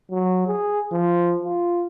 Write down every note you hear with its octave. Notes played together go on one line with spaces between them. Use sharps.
F#3
G#4
F3
F4